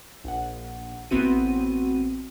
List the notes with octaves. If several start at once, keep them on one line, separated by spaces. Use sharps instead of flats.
A#1 F#5
A1 B3 C4 F#4 D#7